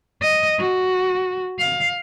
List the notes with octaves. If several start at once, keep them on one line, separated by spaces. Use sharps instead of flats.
D#5
F#4
F5